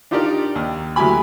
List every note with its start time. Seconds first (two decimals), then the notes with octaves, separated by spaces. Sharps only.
0.11 D4 D#4 F4 G4 A#4 D5
0.55 D#2
0.96 D2 F#3 E4 G4 G#5 B5